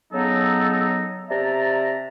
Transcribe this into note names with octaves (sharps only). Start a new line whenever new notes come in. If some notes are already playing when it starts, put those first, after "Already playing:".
C#3 F#3 B3 D#4 A4
C3 D5 E5 A5 A#5